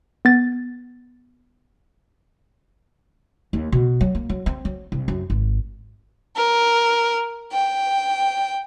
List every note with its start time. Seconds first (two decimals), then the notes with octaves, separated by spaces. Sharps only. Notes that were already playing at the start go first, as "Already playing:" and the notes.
0.25 B3 A6
3.53 D#2
3.72 B2
4.01 F#3
4.15 A#3
4.29 F#3
4.46 C4
4.65 F#3
4.92 C2
5.08 F#2
5.30 G#1
6.36 A#4
7.52 G5